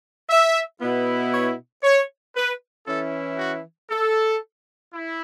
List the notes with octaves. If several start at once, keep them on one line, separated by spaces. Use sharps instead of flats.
E5
B2 B3 E4
C#5
C#5
B4
E3 C#4 E4 A4
F#4
A4
E4